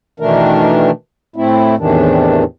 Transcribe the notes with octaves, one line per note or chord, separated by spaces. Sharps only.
B2 D#3 E3 A3 D4 A#4
A2 A3 C4 E4
E2 A2 C3 D#3 E3 D4